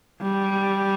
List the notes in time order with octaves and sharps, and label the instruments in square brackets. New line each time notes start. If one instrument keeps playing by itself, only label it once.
[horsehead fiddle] G3